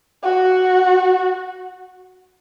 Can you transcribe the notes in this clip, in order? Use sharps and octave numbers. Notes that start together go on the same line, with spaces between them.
F#4